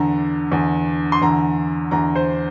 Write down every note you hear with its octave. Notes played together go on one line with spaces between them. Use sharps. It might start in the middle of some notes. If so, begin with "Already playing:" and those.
Already playing: E2 D3 A#5
E2 D3
C6
E2 D3 A#5
E2 D3 A#5
C5